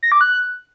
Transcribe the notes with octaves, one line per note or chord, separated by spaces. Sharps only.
A#6
D6
F#6